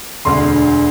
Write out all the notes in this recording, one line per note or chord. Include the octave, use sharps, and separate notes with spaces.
E1 D2 D3 C6